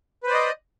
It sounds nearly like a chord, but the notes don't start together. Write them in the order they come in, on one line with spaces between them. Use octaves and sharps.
B4 C5 D5 D#5